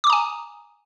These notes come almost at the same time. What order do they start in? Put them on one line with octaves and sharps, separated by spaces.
D6 D#6 A#5 G#5